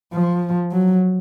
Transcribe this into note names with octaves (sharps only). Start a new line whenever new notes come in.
F3
F#3